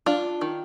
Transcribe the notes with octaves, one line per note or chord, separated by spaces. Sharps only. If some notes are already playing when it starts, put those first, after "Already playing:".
D4 F4
D#3